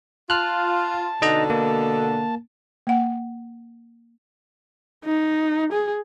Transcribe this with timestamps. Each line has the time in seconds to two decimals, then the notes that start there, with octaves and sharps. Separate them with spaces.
0.30 F4 A5 F6 F#6
1.22 B2 D3 D#4 D#5 A#5
1.50 A#3
2.87 A#3 F#5
5.04 D#4
5.72 G#4